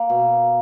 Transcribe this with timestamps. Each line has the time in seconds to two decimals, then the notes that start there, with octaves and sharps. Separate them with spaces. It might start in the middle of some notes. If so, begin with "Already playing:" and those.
Already playing: A#3
0.10 B2